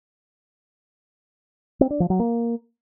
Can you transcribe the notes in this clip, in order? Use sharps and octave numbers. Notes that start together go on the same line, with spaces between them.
C4
D4
F3
F#3
A#3